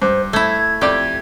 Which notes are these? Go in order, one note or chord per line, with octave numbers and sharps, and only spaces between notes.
G2 C5
A3 E4 G#6
F2 G4 D5